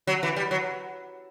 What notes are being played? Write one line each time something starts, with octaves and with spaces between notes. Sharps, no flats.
F#3
E3
G3
F#3